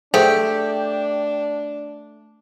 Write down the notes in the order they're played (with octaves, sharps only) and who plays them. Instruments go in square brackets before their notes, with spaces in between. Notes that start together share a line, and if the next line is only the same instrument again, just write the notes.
[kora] A3 [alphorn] D4 [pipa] G4 [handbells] G#4 C5 F#5